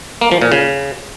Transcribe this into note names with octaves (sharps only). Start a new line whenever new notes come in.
A#3
F3
A#2
C#3